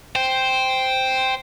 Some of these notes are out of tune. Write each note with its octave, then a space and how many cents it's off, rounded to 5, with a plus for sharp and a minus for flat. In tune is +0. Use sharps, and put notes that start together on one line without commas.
C5 +0 G5 +0